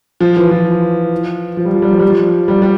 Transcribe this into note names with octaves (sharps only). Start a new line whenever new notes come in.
F3
E3
F3
F3
G3
F3
G3
F3
G3
F3
G3
G3